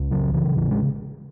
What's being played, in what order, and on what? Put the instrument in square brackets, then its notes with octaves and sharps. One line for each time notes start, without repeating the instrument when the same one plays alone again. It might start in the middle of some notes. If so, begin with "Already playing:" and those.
Already playing: [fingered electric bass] C#2
C#3 F#3
C#3 E3
A1 E3
G#3